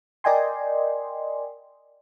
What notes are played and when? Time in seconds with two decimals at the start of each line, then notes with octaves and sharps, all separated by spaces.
0.24 A#4 D5 D#5 G5 G#5 C6